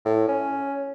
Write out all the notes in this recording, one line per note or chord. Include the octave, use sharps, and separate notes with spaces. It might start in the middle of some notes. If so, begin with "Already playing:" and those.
A2
C#4